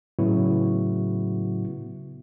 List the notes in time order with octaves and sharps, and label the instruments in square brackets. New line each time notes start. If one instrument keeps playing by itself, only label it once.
[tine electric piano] A2 C#3 F#3 B3 E4 F#4